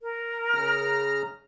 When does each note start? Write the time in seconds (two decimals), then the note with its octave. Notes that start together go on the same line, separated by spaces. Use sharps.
0.01 A#4
0.55 C#3 A#5 F6